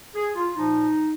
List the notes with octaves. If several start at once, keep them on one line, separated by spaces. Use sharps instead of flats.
G#4
F4
A#2 F3 D#4